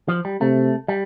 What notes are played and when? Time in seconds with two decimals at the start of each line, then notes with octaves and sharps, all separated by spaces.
0.08 F3
0.25 G3
0.41 C3 A3
0.88 G3